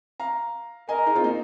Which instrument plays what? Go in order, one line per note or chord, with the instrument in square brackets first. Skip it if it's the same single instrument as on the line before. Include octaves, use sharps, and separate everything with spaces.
[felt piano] F5 A#5
[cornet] A#4 [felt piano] D#5 G#5
[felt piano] D#4 G#4
C4 F4
A#3 D#4